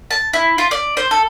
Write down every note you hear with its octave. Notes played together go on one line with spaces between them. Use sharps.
A5
E4
F4
D5
C5
A4